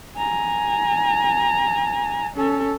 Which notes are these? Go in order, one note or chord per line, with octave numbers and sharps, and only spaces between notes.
G#5 A#5
C#4 A4